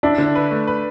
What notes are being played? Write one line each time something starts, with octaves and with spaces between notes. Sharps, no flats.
D4 E4
D3
B4
A3
B4